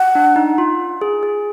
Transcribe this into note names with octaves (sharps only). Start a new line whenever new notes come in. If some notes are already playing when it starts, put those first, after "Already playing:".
Already playing: F#5
D4
D#4
F4
G#4
G#4